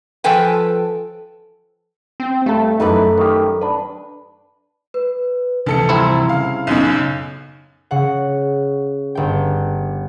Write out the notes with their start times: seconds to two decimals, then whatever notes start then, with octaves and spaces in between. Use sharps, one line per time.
0.24 F3 A4 B4 G5 G#5
2.20 C4
2.46 G2 A3 A4
2.80 F#2 E3 D#4 A4 B4
3.18 D#3 G4
3.61 D4 B4
4.94 B4
5.66 D2 C3 E3 F3 A4 C#7
5.89 C2 C4 E4
6.29 C#3 F5
6.67 B1 F#2 B2
7.91 C#3 F#5
9.15 G1 G5